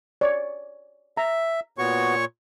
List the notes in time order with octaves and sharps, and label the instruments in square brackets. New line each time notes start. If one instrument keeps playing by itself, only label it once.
[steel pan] C#5 D5
[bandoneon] E5 [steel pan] A#5
[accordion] A#2 C#5 C#6 [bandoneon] B3 F#4